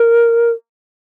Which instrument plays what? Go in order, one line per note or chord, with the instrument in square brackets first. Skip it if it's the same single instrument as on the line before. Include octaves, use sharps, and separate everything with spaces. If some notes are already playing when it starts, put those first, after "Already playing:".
Already playing: [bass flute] A#4